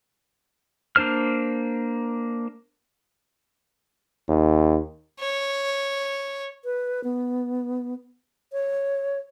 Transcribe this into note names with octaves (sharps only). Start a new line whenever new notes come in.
A#3 D4 C5 F6
D#2
C#5
B4
B3
C#5